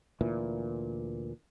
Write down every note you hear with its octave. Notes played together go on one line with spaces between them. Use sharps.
D2 A#2 E3